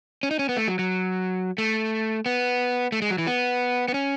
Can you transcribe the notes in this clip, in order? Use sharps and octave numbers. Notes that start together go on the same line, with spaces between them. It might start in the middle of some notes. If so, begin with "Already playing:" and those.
C#4
D#4
C#4
B3
A3
F#3
F#3
A3
B3
A3
G#3
F#3
E3
B3
B3
C#4